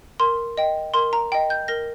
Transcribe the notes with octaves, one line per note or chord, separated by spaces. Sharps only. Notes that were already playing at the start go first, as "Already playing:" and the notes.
A#4 C6
D#5 G5
A#4 C6
A#5
D#5 G5
G6
A#4 A#6